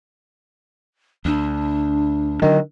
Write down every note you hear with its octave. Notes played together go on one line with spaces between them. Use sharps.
D2 D4
D3 D#3 F#3